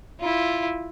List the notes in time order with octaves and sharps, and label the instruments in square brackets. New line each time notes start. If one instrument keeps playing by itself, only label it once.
[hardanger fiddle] E4 F4